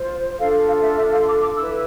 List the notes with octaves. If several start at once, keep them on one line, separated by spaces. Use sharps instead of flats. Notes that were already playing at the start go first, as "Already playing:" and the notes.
Already playing: F4 C5
D4 F4 A4 F5
F5
E5
E5
F5
C6
D6
D6
E4 B4 E6